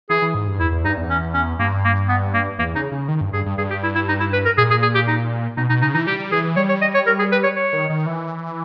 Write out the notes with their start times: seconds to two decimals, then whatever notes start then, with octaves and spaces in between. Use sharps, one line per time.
0.10 E3 G#4
0.22 E3
0.35 G#2
0.47 G2
0.60 E2 E4
0.72 E2
0.85 G2 D#4
0.97 E2
1.10 C#4
1.34 C#4
1.59 G2 A#3
1.84 A#3
2.08 B3
2.34 A#3
2.59 E2 A#3
2.75 C#3 D#4
2.92 C#3
3.08 D#3
3.21 G2
3.33 G2 G#4
3.46 G2
3.58 G2 G#4
3.70 G4
3.83 E4
3.95 E4
4.08 D#4
4.20 E4
4.33 B4
4.45 A#4
4.58 A#2 G#4
4.71 G#4
4.82 G#4
4.95 G4
5.07 D#4
5.57 B2 D#4
5.69 B2 D#4
5.82 C#3 D#4
5.94 E3 D#4
6.07 G3 G4
6.32 E3 G#4
6.56 G3 C#5
6.69 C#5
6.82 D#5
6.94 C#5
7.07 A#4
7.19 G#4
7.32 B4
7.43 C#5
7.56 C#5
7.73 D#3
7.90 D#3
8.06 E3